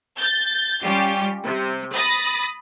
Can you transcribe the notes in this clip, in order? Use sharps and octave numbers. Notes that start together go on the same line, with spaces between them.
G6 A6
G3 C#4 F4 G4
C3
B5 D#6 A6 A#6